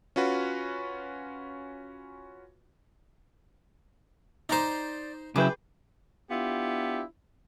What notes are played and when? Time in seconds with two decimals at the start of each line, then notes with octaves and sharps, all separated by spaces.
0.16 C#4 F4 F#4 B4
4.49 D#4 C5 D5 A#5 D6
5.36 C#3 F#3 E4 G#4 B4 G5 D6
6.31 B3 D4 E4 F4 G4